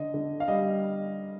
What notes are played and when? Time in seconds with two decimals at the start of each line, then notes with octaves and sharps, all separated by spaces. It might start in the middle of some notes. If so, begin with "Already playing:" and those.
Already playing: D3 D#5
0.14 D3
0.40 F5
0.48 G3 D#5